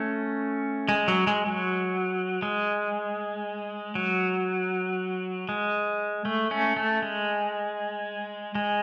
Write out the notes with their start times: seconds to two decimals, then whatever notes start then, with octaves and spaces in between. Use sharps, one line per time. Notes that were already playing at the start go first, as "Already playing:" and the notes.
Already playing: A3 C#4
0.89 G#3
1.08 F#3
1.27 G#3
1.46 F#3
2.42 G#3
3.95 F#3
5.49 G#3
6.25 A3
6.51 A3 C#4
6.77 A3
7.02 G#3
8.55 G#3